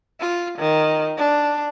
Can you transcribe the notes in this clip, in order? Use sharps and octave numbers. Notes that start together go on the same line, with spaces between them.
F4
D#3
D4